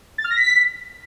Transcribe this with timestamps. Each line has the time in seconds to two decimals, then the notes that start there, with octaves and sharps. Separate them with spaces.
0.18 A6
0.24 F6
0.30 A#6
0.37 B6